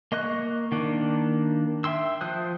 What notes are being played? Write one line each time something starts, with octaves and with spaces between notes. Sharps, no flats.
A#3 D#5 C#6 F#6
D#3 A#3 D4
E5 G5 C6 E6
F3 C5 D#6 F#6